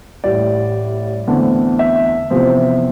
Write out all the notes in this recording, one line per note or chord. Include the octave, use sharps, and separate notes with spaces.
A1 A2 G3 D5
E2 D3 A3 C4
E5
E2 C3 F3 C4